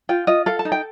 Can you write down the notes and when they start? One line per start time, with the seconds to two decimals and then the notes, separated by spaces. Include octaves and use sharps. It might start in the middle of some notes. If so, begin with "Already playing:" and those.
0.09 F4 G5
0.27 F4 D#5
0.46 A4 F5
0.59 A5
0.65 D#4
0.72 G5